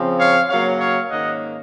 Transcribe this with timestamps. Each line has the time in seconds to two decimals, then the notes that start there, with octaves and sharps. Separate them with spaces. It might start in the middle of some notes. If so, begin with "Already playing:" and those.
Already playing: C#3 F3 C4
0.19 C#5 F5
0.49 C#3 F#3 A#3 C#5 F5
0.80 C#5 F5
1.10 G#2 D#3 A#3 C#4 D#5 F#5